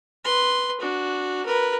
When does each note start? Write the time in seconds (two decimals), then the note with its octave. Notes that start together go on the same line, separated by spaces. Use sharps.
0.25 B4 C6
0.80 D4 F#4
1.45 A#4 B4